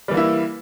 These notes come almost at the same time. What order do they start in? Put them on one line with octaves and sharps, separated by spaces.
G3 E3 A#3 E4